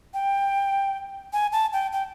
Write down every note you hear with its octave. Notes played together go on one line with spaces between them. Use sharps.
G5
G#5
A5
G5
G5